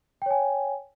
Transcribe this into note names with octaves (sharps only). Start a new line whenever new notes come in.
C#5 G5 G#5